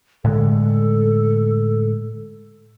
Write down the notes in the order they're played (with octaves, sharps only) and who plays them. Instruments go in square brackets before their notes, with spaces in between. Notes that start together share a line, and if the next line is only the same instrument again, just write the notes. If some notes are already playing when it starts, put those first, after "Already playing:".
[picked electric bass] A2 D3 G#3 [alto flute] A4